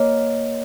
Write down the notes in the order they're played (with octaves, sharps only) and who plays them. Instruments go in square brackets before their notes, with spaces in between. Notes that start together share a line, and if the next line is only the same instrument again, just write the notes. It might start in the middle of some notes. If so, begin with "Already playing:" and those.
Already playing: [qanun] A#3 [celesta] C#5 D#5